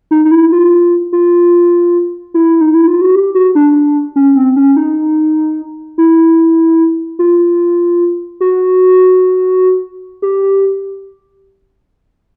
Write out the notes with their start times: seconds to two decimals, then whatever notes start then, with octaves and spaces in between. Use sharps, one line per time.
0.11 D#4
0.25 D#4
0.31 E4
0.52 F4
1.13 F4
2.34 E4
2.61 D#4
2.74 E4
2.88 F4
3.01 F#4
3.15 G4
3.35 F#4
3.55 D4
4.16 C#4
4.36 C4
4.56 C#4
4.76 D#4
5.98 E4
7.19 F4
8.41 F#4
10.22 G4